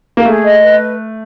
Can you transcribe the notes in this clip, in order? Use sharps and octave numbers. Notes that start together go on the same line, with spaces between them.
A#3
A3 G#4
D#5
B4